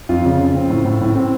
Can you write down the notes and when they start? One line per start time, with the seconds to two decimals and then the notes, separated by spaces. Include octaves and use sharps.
0.09 F2 F4
0.25 C#3
0.40 C#3
0.55 C4
0.70 A2
0.85 A2
1.01 A2
1.16 C4